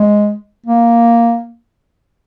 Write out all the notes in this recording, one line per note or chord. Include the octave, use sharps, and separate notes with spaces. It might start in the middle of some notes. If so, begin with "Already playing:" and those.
Already playing: G#3
A#3